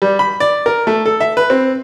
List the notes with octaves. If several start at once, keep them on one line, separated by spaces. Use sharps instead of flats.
G3
B5
D5
A#4
A3
A4
E5
B4
C4